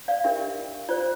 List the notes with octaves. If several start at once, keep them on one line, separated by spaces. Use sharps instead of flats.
D5 F5
D4 G4 A#4 E5
F4 C5 D5